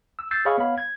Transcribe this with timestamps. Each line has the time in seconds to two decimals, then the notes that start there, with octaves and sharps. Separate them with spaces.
0.19 E6
0.31 E6 G6 A6 C7
0.45 G#4 C#5 D#5 F5 B5 C#6
0.58 B3 C#5 F5 B5
0.78 G#6